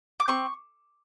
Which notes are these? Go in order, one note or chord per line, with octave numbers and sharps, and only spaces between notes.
D6
C4 C#6